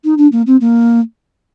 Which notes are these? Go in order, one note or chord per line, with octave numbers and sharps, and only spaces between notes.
D#4
D4
A#3
C4
A#3